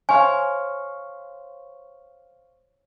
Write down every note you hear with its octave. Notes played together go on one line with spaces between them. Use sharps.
C5 C#5 F5 G#5